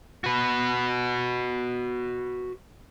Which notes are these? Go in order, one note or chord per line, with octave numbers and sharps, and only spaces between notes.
F#4 B4